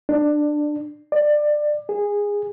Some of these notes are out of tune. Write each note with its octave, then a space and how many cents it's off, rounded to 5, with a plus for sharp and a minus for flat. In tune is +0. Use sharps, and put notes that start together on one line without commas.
D4 +15
D5 +20
G#4 -15